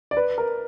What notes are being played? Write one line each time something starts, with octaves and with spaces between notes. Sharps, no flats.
D5
B4
A#4